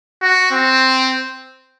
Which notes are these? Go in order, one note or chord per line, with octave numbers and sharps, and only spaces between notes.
F#4
C4